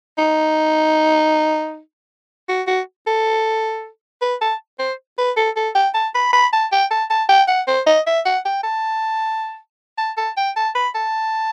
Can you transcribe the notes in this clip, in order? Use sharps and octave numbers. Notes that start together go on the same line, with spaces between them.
D#4
F#4
F#4
A4
B4
A5
C5
B4
A4
A4
G5
A5
B5
B5
A5
G5
A5
A5
G5
F#5
C5
D#5
E5
F#5
G5
A5
A5
A5
G5
A5
B5
A5